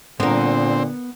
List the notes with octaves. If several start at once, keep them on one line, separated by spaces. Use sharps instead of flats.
A#2 D3 B3 C4 A#4